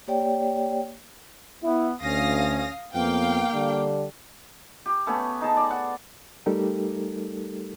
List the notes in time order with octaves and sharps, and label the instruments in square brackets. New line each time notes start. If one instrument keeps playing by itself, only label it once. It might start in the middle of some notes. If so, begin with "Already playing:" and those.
[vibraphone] A#3 G4 C#5 D5 G5
[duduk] B3 [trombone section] E4
[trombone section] D2 [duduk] C#4 [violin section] F5 D#6 A#6
[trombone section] F2 B3 [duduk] A#3 [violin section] F5 G5
[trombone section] D3 G3 D4
[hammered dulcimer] G4
A3 B3 C#4
D#4 G#4 A5
D5
F#5
[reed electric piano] G3 A3 D#4 G4 A4 A#4